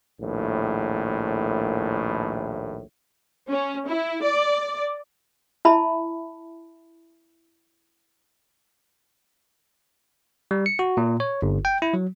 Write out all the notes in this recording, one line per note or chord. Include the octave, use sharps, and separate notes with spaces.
A#1 D#2 A2
C#4
E4
D5
E4 E5 A5 B5
G3
C#7
F#4
A#2
C#5
G1
G5
E4
F#3